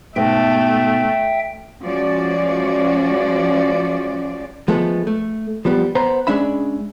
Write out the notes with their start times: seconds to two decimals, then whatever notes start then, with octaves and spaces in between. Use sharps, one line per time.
0.16 G#2 B2 A3 E5 G5
1.83 F3 G#3 C#4 F#4 D5
4.68 F3 G#3 A3 B3
5.07 A3
5.65 F3 G3 B3
5.95 B3 C5 A#5 B5
6.27 G#3 C#4 D4 E5 B5